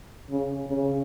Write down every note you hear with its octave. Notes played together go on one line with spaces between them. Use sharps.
C#3
C#3